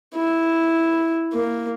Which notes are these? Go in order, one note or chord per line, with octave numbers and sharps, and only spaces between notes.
E4
A#3